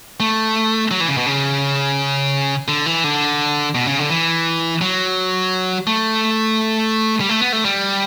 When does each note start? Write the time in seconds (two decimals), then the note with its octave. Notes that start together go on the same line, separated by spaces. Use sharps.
0.20 A3
0.91 F#3
1.01 E3
1.09 C#3
1.17 B2
1.26 C#3
2.68 D3
2.86 E3
3.04 D3
3.75 B2
3.87 C#3
3.99 D3
4.10 E3
4.81 F#3
5.87 A3
7.20 G3
7.29 A3
7.41 B3
7.53 A3
7.65 G3